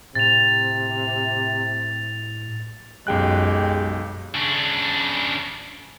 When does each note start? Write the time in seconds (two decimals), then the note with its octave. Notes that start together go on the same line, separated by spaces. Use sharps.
0.15 A2 C3 A6 F7
3.07 B1 F#2 G#3 G4 G5 F#6
4.35 C#3 D4